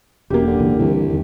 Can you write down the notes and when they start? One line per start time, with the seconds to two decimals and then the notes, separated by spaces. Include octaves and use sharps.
0.30 E1 F#2 A#3 G4
0.47 D3
0.60 C#2 A#2 E3
0.79 C2 G2 D3 E3
1.10 E2 D#3